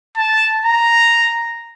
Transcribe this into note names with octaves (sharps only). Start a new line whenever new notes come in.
A5
A#5